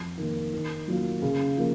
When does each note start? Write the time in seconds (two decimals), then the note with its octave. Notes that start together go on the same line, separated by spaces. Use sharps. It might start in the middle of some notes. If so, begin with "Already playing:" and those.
Already playing: F2
0.18 D#3 A#3
0.53 D#3
0.88 F#3 A#3 F4
1.22 C#3
1.57 F3 A#3